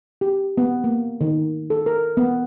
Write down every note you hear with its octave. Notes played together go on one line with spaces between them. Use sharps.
G4
B3
A#3
D#3
A4
A#4
B3